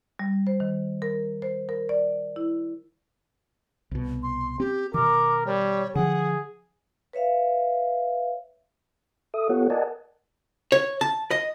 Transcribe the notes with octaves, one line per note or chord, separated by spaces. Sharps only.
G3
C5
D#3
A#4
C5
A#4
D5
E4
C2 B2
C6
C4 G4
B2 D#3 A#4 D6
G3 C#5
D3 F3 G#4 F#5
B4 C#5 E5 F5
A4 E5 D#6
B3 F4 G4 A4 C#5 F#5
A#4 D5 D#5 F#5 G#5 A5
C#5
A5
D#5